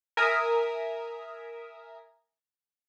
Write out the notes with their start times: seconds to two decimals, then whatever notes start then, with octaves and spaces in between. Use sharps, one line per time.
0.17 A#4 E5 G#5 A#5 D#6